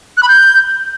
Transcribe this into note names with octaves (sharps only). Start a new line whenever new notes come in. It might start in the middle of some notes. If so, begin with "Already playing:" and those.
F#6
B5
G6